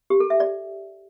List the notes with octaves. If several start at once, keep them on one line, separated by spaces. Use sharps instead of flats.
G4
A4
E5
D5